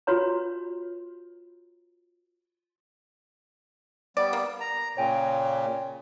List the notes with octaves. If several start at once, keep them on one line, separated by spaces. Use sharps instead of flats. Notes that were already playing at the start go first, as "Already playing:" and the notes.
F4 F#4 B4 C#5 A#5
G3 B3 D5
A#3
A#5
A#2 C#3 C#5 G5 G#5